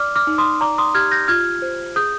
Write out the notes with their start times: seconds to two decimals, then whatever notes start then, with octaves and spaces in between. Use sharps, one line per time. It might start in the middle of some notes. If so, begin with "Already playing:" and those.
Already playing: D5 D6 F6
0.16 D6 F6
0.27 D#4
0.38 C6 D#6
0.61 D5 A#5 D6
0.78 C6 D#6
0.95 G4 F6 G#6
1.11 G6 A#6
1.28 F4 F6 G#6
1.62 C5
1.96 G#4 D#6 G6